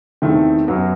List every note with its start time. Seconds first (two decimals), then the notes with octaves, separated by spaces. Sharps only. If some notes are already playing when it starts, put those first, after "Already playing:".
0.22 E2 D#3 A3 C4 E4
0.67 F#2 F#3 B3